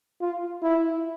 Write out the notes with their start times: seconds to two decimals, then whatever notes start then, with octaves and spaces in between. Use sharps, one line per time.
0.21 F4
0.62 E4